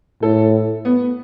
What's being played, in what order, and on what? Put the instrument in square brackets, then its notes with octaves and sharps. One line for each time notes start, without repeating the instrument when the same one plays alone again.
[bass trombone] A2 [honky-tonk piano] A4
[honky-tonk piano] B3